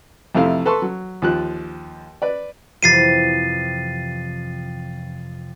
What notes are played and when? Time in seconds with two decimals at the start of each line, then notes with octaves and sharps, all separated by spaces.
0.35 F2 C3 A3 E4 F5
0.66 A4 B4 A5 C6 C#6
0.82 F#3
1.22 D#2 F3 F#6
2.22 B4 D5
2.83 F2 C3 E3 A6 C7 D#7